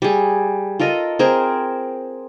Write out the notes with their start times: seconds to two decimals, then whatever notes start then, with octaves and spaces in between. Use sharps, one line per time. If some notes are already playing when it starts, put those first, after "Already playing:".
0.02 G3 G#4
0.79 F4 A4 A#4 D#5
1.19 C4 G#4 A#4